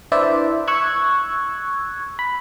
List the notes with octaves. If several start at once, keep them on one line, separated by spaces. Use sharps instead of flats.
D4 E4 B4 C5 D5 E5
C#6 E6 F#6 G#6
B5